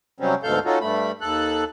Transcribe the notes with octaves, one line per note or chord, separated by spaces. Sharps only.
C3 F#3 G3 C4 C#4
D2 G#2 B2 A4 F5 G6
C#4 D#4 F4 F#4 A4
G2 A3 B5
D#2 A4 F#6